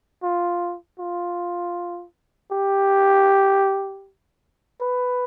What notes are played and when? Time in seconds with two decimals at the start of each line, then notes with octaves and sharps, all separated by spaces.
0.23 F4
0.99 F4
2.51 G4
4.81 B4